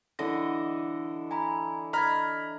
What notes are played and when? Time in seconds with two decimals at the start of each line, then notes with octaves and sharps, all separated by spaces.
0.19 D3 E3 D#5 A#6
1.31 G#5 A#5 B5
1.93 D#5 A#5 B5 F6 G#6